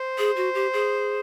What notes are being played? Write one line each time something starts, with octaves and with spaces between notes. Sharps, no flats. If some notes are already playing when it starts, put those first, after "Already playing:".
Already playing: C5
G#4
F#4
G4
G#4